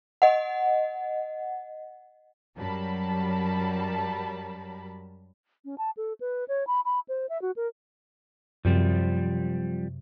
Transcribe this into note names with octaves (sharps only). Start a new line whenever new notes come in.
D#5 F#5
F#2 F#3 G3 A#4 A5 B5
C#4
A5
A4
B4
C#5
B5
B5
C5
E5
F#4
A#4
F#2 C3 F3 G3 C4